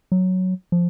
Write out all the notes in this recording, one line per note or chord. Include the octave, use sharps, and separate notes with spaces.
F#3
F3